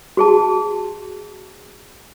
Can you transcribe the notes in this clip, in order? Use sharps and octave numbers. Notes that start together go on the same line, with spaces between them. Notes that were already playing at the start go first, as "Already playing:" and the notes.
F#4 G#4 A5